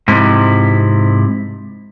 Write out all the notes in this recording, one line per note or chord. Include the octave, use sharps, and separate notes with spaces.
G#2 C3 F3 E4